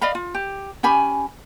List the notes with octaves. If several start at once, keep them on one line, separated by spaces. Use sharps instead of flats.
D5 D#5 F5 B5
F4
G4
C#4 G4 G#5 B5